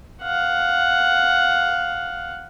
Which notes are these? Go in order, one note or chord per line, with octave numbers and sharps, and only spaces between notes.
F5 F#5